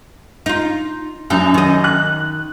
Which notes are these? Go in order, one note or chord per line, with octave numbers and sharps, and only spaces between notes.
D#4 F4
F#2 D4 D#4
D#3 D#5
F#6